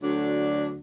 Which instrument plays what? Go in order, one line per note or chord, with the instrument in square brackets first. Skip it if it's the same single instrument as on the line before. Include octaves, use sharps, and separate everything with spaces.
[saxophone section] D2 D3 F#3 D4